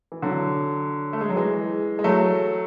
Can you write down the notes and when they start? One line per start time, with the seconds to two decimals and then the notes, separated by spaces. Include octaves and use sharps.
0.12 E3
0.22 D3 F#3
1.13 A3
1.21 G#3
1.29 F#3
1.36 E3 G#3
1.99 G#3
2.04 F#3 A3